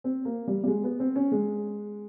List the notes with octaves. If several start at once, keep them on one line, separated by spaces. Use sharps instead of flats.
C4
A#3
G3
G3
G#3
B3
C4
C#4
G#3